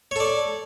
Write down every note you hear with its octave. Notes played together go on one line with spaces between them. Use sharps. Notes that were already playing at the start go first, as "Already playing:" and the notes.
A4 C#5 D5